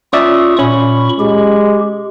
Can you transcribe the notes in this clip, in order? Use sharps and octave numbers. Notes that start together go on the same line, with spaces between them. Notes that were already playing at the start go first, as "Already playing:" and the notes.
C#4 F4 D5 E5 C#6 D#6
A#2 C#4 B5 C#6
G#3 G4